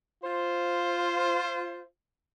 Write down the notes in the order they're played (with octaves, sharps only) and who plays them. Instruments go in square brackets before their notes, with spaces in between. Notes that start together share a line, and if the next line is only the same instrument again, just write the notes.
[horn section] F4 C5